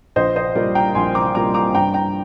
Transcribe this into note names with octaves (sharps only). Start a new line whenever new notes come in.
A#1 C5 D#5
C5 D#5
A#2 G3 A#3 A#4 D5
G5 A#5
A#1 G#5 C6
A#5 D6
A#2 G3 A#3 A#5 D6
A#5 D6
G2 G5 A#5
G5 A#5